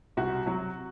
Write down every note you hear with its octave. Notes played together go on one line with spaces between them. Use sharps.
C2 F#4
C3 F#3